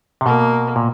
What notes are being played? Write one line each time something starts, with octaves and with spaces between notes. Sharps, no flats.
C3
B2 A#3
A#2